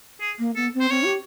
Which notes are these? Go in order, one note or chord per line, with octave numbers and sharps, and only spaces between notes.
G#4
A#3
B3 A4
C4
C5
C4 C#5
G4